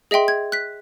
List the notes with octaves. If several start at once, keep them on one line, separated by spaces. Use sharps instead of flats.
G#4 D#5 E5 G5 C6
G#6
F#6 B6